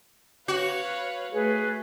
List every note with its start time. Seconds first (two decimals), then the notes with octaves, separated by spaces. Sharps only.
0.48 F#4 B4 C#5 F5
1.32 A3 G#4 B4